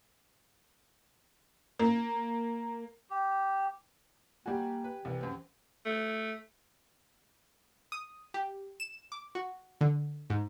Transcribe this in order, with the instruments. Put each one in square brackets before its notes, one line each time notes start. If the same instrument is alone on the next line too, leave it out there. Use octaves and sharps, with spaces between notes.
[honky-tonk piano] A#3
[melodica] G4
[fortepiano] G3 F#4 [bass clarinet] A#3 [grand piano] G4 G#5
[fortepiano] B4
[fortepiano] C2 [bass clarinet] E3
[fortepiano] F#2 C4
[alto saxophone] A3
[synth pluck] D#6
G4
E7
D6
F#4
D3
G#2